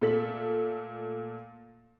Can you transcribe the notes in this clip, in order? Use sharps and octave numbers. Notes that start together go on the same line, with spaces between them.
A#2 A3 A4 B6 F#7